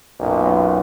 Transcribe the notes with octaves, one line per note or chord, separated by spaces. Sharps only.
B1 F#2 A#2